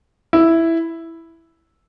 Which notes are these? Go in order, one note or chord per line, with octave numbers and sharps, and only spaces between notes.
E4